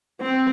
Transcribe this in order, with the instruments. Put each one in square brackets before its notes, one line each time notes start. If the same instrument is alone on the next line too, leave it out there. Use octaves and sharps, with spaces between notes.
[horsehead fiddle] C4